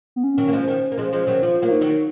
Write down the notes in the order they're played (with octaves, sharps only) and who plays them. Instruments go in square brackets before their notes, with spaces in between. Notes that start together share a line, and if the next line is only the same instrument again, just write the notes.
[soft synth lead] B3
C#4
[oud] D#3 F#3
A#3
F3 G#3
D#3
A#3
F3 G#3
F3 G#3
D#3 F#3
[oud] F3 [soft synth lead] F4
[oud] F#3 A#3
[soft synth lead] D#4
[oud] D#3 F#3